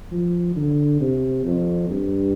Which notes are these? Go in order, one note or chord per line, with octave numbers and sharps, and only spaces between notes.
F3
D3
C3
F2
G2